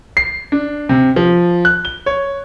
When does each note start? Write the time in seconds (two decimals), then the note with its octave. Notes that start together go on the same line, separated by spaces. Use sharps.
0.17 C7
0.52 D4
0.89 C3
1.16 F3
1.65 F#6
1.85 G7
2.06 C#5